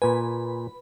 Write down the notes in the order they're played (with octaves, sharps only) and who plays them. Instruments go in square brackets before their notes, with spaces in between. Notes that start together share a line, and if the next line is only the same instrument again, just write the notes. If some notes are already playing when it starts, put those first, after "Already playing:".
[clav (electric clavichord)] A#2 G#5 [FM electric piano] B4 B5